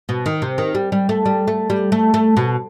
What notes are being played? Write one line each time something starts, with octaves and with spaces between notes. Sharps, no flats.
B2
D#3
C3
D#3
G3
G3
A3
G3
A3
G3
A3
A3
B2